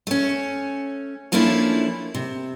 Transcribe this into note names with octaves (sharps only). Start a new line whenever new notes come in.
A3 C#4
F3 A3 A#3 C#4 D4 E4
C3